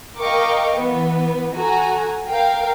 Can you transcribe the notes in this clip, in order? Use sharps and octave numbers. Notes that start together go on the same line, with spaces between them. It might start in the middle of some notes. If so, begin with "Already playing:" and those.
A#4 D#5 F5 G5 C#6 D6
E3 B3
F#4 A4 G#5 A#5
A#4 F5 G5